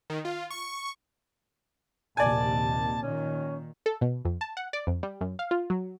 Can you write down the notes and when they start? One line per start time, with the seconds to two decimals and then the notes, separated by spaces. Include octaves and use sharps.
0.10 D#3
0.25 F4
0.51 C#6
2.17 A#1 D#2 C3 D5 G#5 A5
3.03 A#2 D#3 C#4
3.86 A4
4.01 B2
4.25 F2
4.41 A5
4.57 F#5
4.73 D5
4.87 F2
5.03 G3
5.21 F#2
5.39 F5
5.51 F4
5.70 F#3